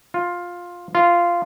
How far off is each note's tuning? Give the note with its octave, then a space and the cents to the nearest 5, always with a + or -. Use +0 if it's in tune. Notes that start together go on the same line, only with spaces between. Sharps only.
F4 +10
F4 -10